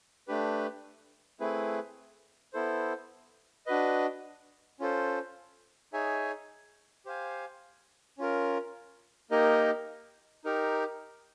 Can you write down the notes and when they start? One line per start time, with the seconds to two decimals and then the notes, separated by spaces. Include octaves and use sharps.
0.28 A3 D4 G4 B4
1.40 A3 C4 E4 G#4 B4
2.53 B3 E4 A4 C5
3.66 D4 F#4 B4 D#5
4.80 C#4 F4 A4 C5
5.93 D#4 G#4 C#5 E5 G#5
7.05 G4 C5 F5 G#5
8.18 C#4 F4 A#4
9.31 A#3 D#4 G4 A#4 D#5
10.45 D#4 G4 A#4